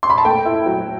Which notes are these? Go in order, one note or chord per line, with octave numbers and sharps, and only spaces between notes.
C6
B5
A5
A3 G5
E4
F#3